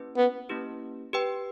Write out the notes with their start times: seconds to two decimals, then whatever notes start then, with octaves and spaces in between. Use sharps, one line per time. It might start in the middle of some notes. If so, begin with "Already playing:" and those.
Already playing: A#3 C#4 E4 G4 B4
0.17 B3
0.49 A#3 C#4 E4 G4 B4
1.13 G4 B4 G5